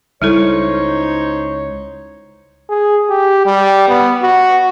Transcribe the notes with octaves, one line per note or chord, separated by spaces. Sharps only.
C#2 G3 D#4 E4 A4 C5 C#5
G#4
G4
G3
B3
F#4